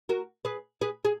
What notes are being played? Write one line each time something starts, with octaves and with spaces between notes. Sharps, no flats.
F#4 A#4
G#4 B4
G#4 B4
G#4